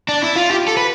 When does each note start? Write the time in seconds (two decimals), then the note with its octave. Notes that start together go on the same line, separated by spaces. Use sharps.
0.08 D4
0.22 E4
0.36 F4
0.50 G4
0.68 A4
0.77 B4